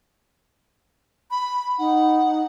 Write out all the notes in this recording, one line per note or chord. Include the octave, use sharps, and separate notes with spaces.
B5
D#4 F#5